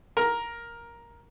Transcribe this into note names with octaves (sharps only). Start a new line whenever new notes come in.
A#4